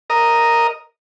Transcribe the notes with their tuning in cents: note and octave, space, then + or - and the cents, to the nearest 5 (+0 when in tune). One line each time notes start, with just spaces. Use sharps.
A#4 +0 D#5 +0